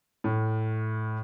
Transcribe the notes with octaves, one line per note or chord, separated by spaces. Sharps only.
A2